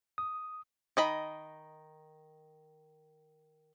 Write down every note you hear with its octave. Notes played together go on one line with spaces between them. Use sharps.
D#6
D#3 D#5 B5